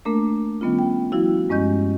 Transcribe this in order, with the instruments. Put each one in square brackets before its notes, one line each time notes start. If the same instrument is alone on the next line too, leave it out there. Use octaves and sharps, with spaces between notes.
[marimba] A3 A#3 D4 A#4
D#3 G3 B3 C#4 F4
G5
F3 G3 E4 F#4
G2 G#3 C#4 D#5 G6